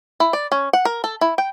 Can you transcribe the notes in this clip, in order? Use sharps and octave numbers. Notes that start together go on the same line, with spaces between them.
E4
D5
C#4
F#5
A#4
A4
E4
G5